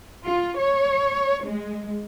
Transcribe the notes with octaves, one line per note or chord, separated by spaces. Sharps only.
F4
C#5
G#3